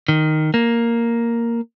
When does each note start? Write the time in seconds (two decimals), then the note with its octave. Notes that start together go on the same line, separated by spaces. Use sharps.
0.08 D#3
0.54 A#3